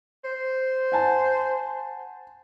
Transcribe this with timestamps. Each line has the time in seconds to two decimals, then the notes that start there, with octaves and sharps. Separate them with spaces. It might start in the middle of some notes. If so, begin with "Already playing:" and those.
0.24 C5
0.92 F#5 G#5 A5